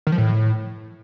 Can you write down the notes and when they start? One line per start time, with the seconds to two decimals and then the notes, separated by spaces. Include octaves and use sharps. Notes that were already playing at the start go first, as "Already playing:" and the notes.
0.07 D#3
0.12 F3
0.18 A2